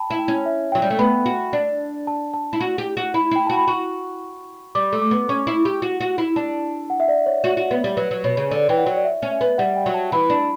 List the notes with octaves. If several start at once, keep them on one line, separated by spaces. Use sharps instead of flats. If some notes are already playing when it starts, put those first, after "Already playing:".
Already playing: G5 A5 B5
E4
G5
C#4
E5
F#3 G5
G3
A3
B3 B5
F#4
D4
A5
A5
E4
F#4
G4
F#4
E4 B5
E4 G5
F#4 A5
B5
F#4 C#6
G3 D6
A3
D6
B3
C#4 C#6
E4
G4
F#4
F#4
E4
D4 A5
F#5
E5
D5
C#5
F#4
F#4
B3
G3
F#3 B4
F#3
B2 C#5
C#3
D3 D5
E3 G5
F#5
F#3
D5
E5
C#4
E5
B3
G3 F#5
G5
F#3
A5
E3 B5
D4 B5